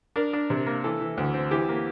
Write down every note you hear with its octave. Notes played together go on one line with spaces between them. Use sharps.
D4 A#4
D4
C3
A#3
E3 A4
E3
D2
C4
E3 G4
A#3